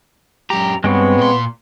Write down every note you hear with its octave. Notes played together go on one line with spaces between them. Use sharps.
F#2 G4 A#5
G2 G#3 B3 C4 C#5
A#2 C6